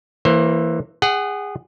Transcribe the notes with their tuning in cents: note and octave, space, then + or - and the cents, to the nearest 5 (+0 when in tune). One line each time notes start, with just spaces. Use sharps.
E3 +0 A#3 -20 C5 +25
G#4 -20 F#5 +20